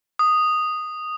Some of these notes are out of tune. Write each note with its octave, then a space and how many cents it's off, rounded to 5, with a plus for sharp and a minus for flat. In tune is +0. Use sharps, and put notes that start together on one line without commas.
D#6 -5